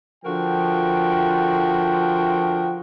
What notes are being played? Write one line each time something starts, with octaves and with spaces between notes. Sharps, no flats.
D3 F3 F#4 A#4 G5